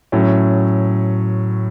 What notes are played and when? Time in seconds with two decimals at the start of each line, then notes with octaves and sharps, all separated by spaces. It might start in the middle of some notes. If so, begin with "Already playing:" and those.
0.12 A2 F#3 C#4